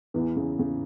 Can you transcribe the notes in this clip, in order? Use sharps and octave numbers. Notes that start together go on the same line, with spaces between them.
E2 E3
C#3
C#3